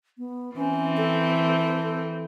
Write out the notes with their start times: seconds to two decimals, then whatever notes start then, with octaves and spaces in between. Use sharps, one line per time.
0.18 B3
0.56 E3 C4 C#4
0.97 A4